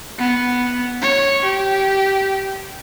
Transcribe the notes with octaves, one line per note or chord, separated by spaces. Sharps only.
B3
C#5
G4